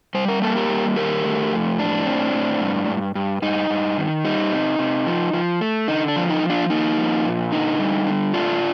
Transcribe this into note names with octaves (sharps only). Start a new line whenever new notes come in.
G3 C5
A#4
A#3 A4
G4 A#4
G3
D#3 G4 A#4
A3
F2
A2 D4
C4
A2
G2
G2
G2
G2 D#4
G2
D#3
G3 D#4
C3
C3
F3
F3
A3
D3 D#4
D4
F3
D#4
F3
D4 F4
A#3 D#4
F3
A#2
D3 D#4
G3
D3
A3 D4 F4